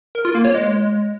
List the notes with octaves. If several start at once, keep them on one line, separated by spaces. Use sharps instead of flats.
A#4
F4
A#3
C#5
G#3